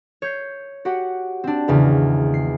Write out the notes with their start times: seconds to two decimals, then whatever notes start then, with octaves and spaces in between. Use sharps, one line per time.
0.22 C#5 G6 C7
0.85 F#4 G4 F#5
1.44 C4 D4
1.68 G#1 E2 C#3
2.34 C7